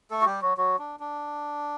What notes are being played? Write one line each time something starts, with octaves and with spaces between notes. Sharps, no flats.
A3 A4
F#4
G3 G4
F#3 F#4
F#3 F#4
D4
D4